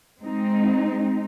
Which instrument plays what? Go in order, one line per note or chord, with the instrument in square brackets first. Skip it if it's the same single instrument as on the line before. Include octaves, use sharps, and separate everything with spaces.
[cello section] G#3 C4 D#4